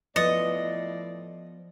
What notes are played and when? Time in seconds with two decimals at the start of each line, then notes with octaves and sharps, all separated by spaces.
0.16 A2 F3 B3 B4 D5 D#5 A6 C#7